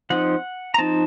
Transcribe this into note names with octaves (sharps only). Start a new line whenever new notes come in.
F3 C4 D#4 F#5
A#5
F3 C4 D#4 A5